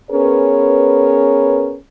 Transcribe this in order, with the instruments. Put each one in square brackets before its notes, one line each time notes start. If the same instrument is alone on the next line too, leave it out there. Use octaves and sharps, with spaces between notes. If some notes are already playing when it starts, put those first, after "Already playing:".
[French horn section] B3 C#4 G#4 A#4 B4 C#5